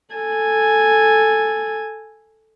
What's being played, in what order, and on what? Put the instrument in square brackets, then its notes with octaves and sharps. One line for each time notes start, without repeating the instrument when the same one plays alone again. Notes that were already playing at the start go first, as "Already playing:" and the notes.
[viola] A4 G#5